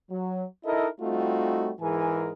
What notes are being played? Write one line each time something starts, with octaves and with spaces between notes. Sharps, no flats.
F#3
D#4 E4 A4 A#4 D#5 E5
G3 A3 C4 D#4 F4 F#4
G#2 E3 G#4 A#4 G#5